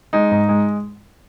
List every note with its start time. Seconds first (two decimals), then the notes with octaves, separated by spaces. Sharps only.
0.13 G#3 D#4
0.32 G#2
0.49 G#3